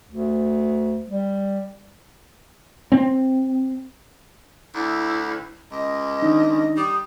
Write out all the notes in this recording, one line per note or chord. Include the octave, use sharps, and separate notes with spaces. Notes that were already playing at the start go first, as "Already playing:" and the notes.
D2
G3
C4
D2 E4
C#2 D#5
D#3 D4 D#4
G3 D#6